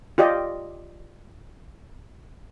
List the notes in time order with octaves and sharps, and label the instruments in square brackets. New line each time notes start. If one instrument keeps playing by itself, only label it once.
[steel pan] F4 G4 D5 D#5